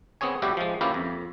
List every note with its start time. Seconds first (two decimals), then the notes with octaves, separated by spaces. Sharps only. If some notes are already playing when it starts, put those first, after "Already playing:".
0.21 B3 C4 G#4 C#5 G#5
0.42 A2 G3 E4 F#4 G4
0.57 F3 G#3
0.81 A#3 C#4 E4 F4 G4 B4
0.94 F2